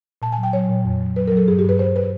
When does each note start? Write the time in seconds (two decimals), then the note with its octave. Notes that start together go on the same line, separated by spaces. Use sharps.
0.22 A#2 A5
0.32 G#5
0.38 F#3
0.43 G5
0.53 F#3 C#5
0.69 A#2
0.85 F2
1.01 F#3
1.16 F#3 B4
1.28 F#3 A#4
1.37 A4
1.48 G2 G#4
1.59 G4
1.64 G2 B4
1.79 G2 C5
1.96 B4